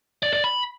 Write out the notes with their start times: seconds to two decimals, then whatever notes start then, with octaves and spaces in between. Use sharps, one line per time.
0.23 D5
0.33 D5
0.44 B5